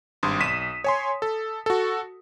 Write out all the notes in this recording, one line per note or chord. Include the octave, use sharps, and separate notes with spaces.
G#1 G2 C6 D#6
B1 B6 D#7 E7
C#5 G#5 C6
A4
F#4 A4